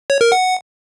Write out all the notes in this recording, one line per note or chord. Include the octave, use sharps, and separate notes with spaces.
C#5
A#4
F#5